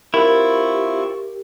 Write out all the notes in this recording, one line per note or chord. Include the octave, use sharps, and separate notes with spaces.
C4 E4 F4 G4 A#4 B5 C#6